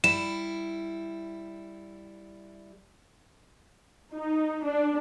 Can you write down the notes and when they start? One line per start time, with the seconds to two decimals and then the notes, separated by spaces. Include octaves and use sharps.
0.04 G3 E4 E7
4.12 D#4
4.65 D4